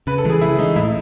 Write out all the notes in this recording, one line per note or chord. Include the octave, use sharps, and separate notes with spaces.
C#3 B4
A4
E3 G#3 G#4
C#3 E4
E3 G#3 D#4
A2 E4